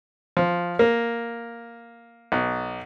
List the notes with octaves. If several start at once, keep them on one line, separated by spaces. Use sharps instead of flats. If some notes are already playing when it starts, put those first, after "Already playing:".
F3
A#3
B1